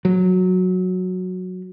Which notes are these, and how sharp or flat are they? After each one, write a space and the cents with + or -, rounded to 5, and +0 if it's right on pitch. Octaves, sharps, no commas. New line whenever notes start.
F#3 -10